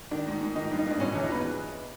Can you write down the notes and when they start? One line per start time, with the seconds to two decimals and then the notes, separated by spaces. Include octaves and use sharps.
0.11 D#3 D4
0.27 G#2
0.41 G#2
0.55 D#3 D#4
0.71 G2
0.78 D#4
0.86 G2 D4
1.00 B2 C#4
1.15 E2
1.23 D#4
1.31 B4